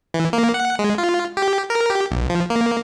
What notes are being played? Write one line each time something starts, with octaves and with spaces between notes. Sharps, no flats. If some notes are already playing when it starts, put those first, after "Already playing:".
E3
A#3
F#5
G#3
F4
G4
A#4
G4
B1
F3
A#3